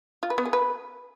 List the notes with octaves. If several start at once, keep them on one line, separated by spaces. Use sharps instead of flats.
F4
B4
B3
G#4
B4